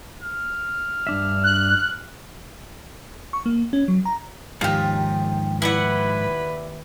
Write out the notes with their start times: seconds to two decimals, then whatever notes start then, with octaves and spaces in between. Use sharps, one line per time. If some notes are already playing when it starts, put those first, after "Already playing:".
0.23 F6
1.07 G2 D4 E5
1.44 F#6
3.33 C#6
3.46 A#3
3.73 C#4
3.88 F#3
4.05 A#5
4.61 D#2 G#2 D#3 F3 D#4 F4 G4
5.62 E4 B4 D5 F#5